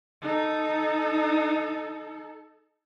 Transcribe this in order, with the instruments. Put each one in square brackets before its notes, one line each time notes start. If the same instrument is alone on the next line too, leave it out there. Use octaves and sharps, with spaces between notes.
[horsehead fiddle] D#4 A4